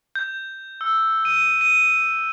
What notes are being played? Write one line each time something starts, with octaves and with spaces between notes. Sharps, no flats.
G6
E6
D#7
D#7